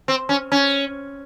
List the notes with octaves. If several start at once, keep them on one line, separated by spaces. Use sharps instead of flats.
C4
C#4
C#4